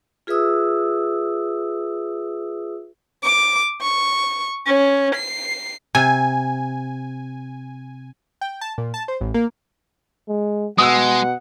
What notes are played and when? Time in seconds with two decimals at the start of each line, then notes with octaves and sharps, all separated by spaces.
0.27 F4 G#4 B4 E5 D#6 E6
3.23 D6
3.81 C#6
4.66 C#4
5.15 C7
5.95 C3 G#5
8.41 G5
8.61 A5
8.78 A#2
8.94 A5
9.08 C5
9.21 A1
9.34 A#3
10.28 G#3
10.78 B2 G#3 F#5 D#6 E6